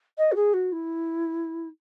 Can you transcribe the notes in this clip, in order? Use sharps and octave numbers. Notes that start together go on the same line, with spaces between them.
D#5
F#4
G#4
F#4
E4